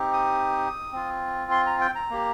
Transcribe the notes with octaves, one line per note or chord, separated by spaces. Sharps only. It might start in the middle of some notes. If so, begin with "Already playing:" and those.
Already playing: C4 D#4 G4
D#6
C4 F4
C6
A#5
G5
A#5
A#3 G4